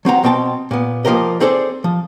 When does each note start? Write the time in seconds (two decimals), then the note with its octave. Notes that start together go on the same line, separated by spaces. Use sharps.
0.05 F#3 C4 F#5 A#5
0.24 B2 C4 G5 A5 C6
0.71 A#2 B3
1.05 F3 A#3 G4 A#4 D#5
1.40 C4 G#4 A4 C5 D5
1.84 F3